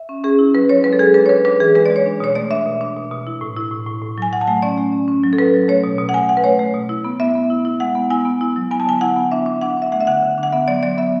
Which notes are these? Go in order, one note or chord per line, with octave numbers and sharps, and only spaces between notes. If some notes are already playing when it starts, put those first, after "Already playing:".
Already playing: E5
C#4
C#4 G#4
E4
F#3 B4
F#3 C#5
G#3 B4
A4
G#3 G#4
D4 B4
C#5
D4 B4
D4 B4
E3 G#4
G#3 B4
G#3 D5
C#5
D4
B2 C#5
A3 D5
D4 E5
B2
D4
B2
B2
E4
A2
E4
A2
A2
A2
F#3 G#5
F#3 F#5
A5
A3 G#5
C#4 D5
A3
C#4
C#4
F#3
A4
F#3 B4
F#3
A3 C#5
B2
B2
F#5
A3 G#5
B2 F#5
B4
A3 C#5
A3
B2
E4
B3
B3 E5
B3
E4
E4
G#3 F#5
B3
E4 G#5
B3
E4
F#3
B3 G#5
A5
D3 G#5
E4 F#5
B3
D4 E5
D4
D4 F#5
D4 E5
A3 F#5
E5
D3 F#5
D3
D4
F#5
B3 E5
F#3 D5
F#3 D5
B3 E5